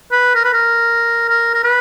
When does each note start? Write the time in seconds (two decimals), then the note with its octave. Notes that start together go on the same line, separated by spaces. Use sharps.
0.11 B4
0.35 A#4
0.45 B4
0.53 A#4
1.29 A#4
1.54 A#4
1.64 B4